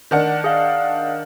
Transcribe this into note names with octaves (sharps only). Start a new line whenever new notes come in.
D#3 D4 F#5
G#4 F5